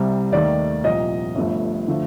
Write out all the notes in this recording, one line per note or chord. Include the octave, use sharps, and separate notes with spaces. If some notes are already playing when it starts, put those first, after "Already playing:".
Already playing: C2 C3 G3
D#2 D#3 A3 D5
C2 A#2 F3 D#5
G1 G2 F3 A3
D3 F3 A3